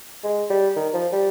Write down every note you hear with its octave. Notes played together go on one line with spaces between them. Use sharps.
G#3
G3
D#3
F3
G3